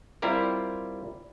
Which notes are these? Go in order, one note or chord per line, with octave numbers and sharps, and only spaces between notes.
G3 C4 E4 F4 G4 A#4